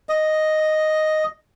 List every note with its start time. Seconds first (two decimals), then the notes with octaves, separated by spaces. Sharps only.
0.09 D#5